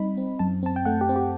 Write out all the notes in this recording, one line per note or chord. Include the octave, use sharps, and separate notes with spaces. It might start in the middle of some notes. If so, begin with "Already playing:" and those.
Already playing: G3 C4 D#4 B5
C4
F#2 A5
C4 A5
G5
A3 F#5
G4
C4
G4